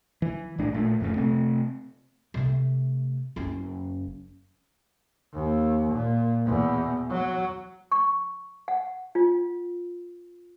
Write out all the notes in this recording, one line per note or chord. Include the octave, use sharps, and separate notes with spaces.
E3
A#1 A2 G#3 D4
A#2 A3
D1 F2 A2 C#3
C3 A3 C4
C3 A3
F#1 C#4
D#2
A#2
E2 B2
F#3
C#6
F#5
F4